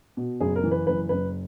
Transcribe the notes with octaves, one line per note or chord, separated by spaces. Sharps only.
B2
F#1 G#4
A#4
E3
B4
F#1 B4
F#1 B4